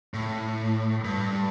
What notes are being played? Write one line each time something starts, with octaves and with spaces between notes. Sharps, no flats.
A2
G2